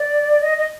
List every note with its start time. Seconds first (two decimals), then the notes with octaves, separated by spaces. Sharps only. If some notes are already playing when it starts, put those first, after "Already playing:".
Already playing: D5
0.42 D#5
0.58 D#5